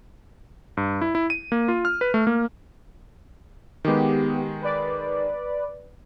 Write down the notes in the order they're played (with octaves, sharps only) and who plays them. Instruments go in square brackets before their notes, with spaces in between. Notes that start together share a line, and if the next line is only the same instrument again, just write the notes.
[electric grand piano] G2
E4
E4
D#7
A#3
F4
F6
B4
A3
A#3
[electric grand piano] D#3 G#3 [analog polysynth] B3 G4
[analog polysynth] B4 D5